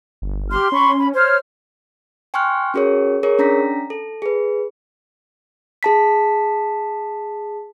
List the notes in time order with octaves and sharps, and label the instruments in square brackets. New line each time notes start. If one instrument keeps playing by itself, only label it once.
[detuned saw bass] G1
[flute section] G4 F6 [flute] C6
[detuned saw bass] C#4 [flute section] B5 C#6
[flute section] B5
[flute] C5 [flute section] C#5 F6
[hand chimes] G5 G#5 C6 C#6 F6 F#6
C#4 F#4 G#4 A#4 C#5
G#4 A#4 C#5
C#4 D4 A#5 A#6 B6
A4
G#4 B4
G#4 A5 B6